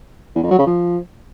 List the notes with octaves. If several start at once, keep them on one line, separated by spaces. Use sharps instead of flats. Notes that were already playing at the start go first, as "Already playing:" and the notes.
E2
F2
F#3
C#3
F3